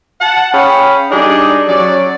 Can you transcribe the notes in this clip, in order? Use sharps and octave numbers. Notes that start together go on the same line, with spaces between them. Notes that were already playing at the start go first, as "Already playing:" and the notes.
F#5 A5
C#4 G#4 F5 G5 B5
G3 D4 D#4 G#4 A4
F#3 C#4 D5